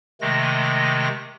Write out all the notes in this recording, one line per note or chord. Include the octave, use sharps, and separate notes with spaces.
C3 D#3 G#3 A3 A#6